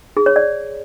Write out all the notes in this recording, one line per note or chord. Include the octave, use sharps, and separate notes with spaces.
G#4
C#5
D5